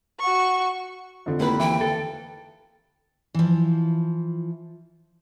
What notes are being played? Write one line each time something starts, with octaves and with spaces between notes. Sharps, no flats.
F#4 C#6
F2 D3
D#2 E4 B4
E3 G5
A4
E3 F3